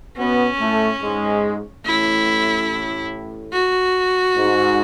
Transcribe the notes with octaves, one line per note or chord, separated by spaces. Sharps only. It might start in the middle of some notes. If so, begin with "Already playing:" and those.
B2 B3 C#4
A2 A3
G#2 G#3
A1 A2 E4
F#4
G#2